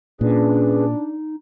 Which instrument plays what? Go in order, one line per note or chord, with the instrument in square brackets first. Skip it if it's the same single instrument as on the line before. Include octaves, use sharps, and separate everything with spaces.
[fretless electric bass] A#2 [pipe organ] C#4 G#4 B4 [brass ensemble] D4
[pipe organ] D#4